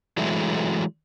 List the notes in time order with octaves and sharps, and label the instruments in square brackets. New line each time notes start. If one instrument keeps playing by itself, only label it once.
[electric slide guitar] E3 F#3 G#3 A3